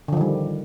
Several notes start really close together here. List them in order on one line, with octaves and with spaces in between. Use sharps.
D3 F3 D#3 G3